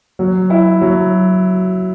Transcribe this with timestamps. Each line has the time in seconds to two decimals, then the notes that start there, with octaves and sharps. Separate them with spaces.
0.19 F#3
0.50 E4
0.81 F#3